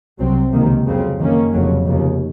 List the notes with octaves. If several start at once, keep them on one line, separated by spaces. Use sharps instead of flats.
C2 C3 F#3 C4
C#2 C3 D#3 A#3
F2 C#3 F#3 C4
F#2 D#3 A#3 C#4
F1 F2 C#3 F#3
F1 D#2 C#3